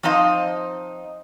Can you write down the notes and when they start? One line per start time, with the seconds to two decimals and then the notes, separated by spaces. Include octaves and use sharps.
0.03 F3 C4 D#4 D#5 F5